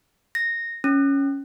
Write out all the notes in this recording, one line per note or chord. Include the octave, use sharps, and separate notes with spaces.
A#6
C#4